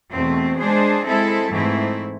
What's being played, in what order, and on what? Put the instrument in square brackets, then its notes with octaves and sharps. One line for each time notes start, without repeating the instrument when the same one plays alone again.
[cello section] E2 B2 A3 C4
G#3 D4 G#4 C5
G#3 C4 E4 A4
G#2 E3 A3 C4 E4